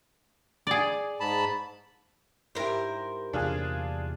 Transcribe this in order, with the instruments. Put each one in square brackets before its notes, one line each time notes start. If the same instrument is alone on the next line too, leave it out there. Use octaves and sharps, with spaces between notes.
[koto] G#4 D5
[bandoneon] G#2 A5 B5
[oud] G#2 E4 G4 [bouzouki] A#4 C5
[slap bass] E2 C3 A#3 [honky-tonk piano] D4 F4 G#4